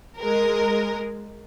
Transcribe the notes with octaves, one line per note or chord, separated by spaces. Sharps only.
G#3 A#4